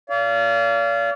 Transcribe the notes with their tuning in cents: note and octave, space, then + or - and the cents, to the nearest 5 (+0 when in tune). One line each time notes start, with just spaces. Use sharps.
D5 -45 F5 -25